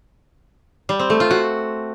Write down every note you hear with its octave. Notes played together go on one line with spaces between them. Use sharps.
G3
C4
A3
F4
F#4